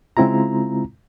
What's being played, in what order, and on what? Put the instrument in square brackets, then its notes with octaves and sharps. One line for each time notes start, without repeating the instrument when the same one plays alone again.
[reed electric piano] C#3 G#3 C4 E4 F4 A#5